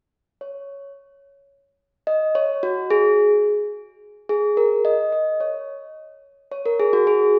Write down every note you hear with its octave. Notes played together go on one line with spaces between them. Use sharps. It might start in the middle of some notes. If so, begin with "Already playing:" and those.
C#5
D#5
C#5
F#4
G#4
G#4
A#4
D#5
D#5
C#5
C#5
A#4
G#4
F#4
G#4